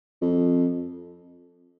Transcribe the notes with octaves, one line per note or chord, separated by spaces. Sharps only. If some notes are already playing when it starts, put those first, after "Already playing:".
F2